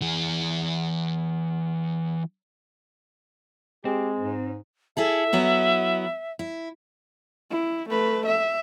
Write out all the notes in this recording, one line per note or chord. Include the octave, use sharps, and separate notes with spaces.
E3 G#4
G#3 C4 G4
G#2
E4 G#4 A4 E5
F#3 B3 E4
E4
E4
A3 B4
E5